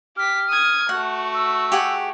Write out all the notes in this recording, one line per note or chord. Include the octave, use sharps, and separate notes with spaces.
G4 F6 B6
D#6 G#6
A3 F#4 F#5
E6
G4 G#4 F#5